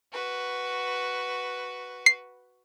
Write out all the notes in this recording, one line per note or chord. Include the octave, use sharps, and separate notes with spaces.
F#4 B4
C7